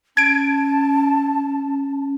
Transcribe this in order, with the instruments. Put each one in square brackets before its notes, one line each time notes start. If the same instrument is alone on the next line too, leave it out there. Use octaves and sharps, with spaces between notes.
[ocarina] C#4 [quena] A5 [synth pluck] G#6 D7